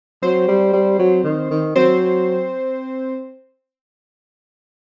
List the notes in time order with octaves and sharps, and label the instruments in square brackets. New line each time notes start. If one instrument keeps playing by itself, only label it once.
[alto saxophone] F#3 [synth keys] C4 C5
[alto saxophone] G3
G3
F#3
D#3
D#3
[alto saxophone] F#3 [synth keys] C4 C5